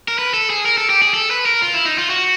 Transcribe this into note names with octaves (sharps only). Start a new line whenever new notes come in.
A#4
B4
A4
G#4
A#4
A4
G4
G#4
A4
B4
A#4
F4
E4
D#4
F4
F#4